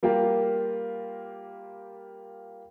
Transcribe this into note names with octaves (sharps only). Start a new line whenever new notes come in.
G3 A#3 F4 G4 A#4